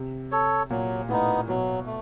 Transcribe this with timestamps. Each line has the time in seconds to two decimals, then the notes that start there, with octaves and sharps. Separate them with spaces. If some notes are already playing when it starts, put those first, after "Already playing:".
Already playing: C3
0.32 A4 C#5
0.70 A#2 F#3
1.09 A2 B3 D#4
1.48 B2 F#3
1.86 A3